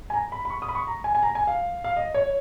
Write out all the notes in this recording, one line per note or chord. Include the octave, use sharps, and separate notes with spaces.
G#5
A#5
B5
B5
C#6
D#6
B5
C#6
A#5
G#5
G#5
A#5
G#5
F5
F5
D#5
C#5